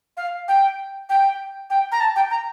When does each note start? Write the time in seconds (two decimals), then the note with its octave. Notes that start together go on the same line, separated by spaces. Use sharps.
0.17 F5
0.48 G5
1.09 G5
1.70 G5
1.92 A#5
2.00 A5
2.16 G5
2.30 A#5